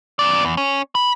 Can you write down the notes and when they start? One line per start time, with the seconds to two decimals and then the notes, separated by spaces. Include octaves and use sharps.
0.19 F#2 D5
0.45 E2
0.57 C#4
0.95 B5